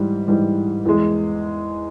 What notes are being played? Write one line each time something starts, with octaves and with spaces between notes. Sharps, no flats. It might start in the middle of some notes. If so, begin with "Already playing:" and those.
Already playing: G#2 E3 G3
G#2 E3 G3
E2 E3 G#3